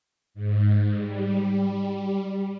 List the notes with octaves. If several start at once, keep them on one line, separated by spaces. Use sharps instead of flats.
G#2
G3